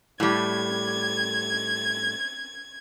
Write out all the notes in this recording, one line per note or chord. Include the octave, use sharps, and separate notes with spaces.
A2 G3 G#6